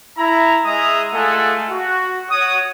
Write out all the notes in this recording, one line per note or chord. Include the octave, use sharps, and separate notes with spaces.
E4 A#5
G#3 G#4 D#5 E5 A#5 D#6
G#3 A3 F4 A4 F#5 G#5
F#4
F#4 C#5 D#6